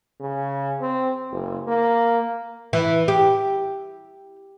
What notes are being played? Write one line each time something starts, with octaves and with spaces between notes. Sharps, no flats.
C#3
C4
F#1
A#3
E3
G4